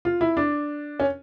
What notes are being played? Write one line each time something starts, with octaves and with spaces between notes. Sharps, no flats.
F4
E4
D4
C#4